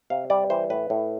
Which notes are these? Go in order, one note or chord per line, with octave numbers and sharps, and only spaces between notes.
C3 F5
G3 D5
E3 C5
A2 B4
A2